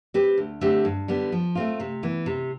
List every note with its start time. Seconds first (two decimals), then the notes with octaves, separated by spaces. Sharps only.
0.14 C4 G4 B4
0.38 D2
0.61 D3 A3 C4 G4
0.85 G2
1.08 D3 G3 B3
1.32 F3
1.55 A3 C4 F4
1.80 C3
2.03 E3 B3
2.26 C3